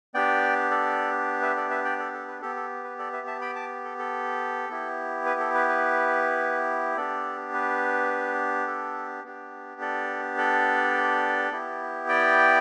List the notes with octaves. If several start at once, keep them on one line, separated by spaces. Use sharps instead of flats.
B3 D4 G4 D5 G5
A4 D5
B4 E5
A4 D5
B4 E5
D5 G5
A4 D5
A4
B4
B3 G4 A4
A4
B4
A4 D5
B4 E5
E5 A5
G5 B5
A5 D6
A4
A4
B3 E4 G4
B4
A4
B4
B4
B3 D4 G4 A4 D5
B4
A4
B3 D4 G4
A4 D5
A4 D5
B3 E4 G4
D5 G5